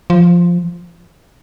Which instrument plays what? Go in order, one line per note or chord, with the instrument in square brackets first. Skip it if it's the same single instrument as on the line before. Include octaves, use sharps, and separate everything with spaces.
[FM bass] F3